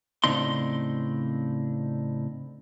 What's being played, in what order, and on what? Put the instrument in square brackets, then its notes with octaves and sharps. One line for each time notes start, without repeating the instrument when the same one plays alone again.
[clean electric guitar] A2 C#3 C4 D4 D#4 C6